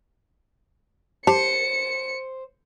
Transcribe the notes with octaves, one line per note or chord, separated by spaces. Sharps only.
G4 C5 A5 C#7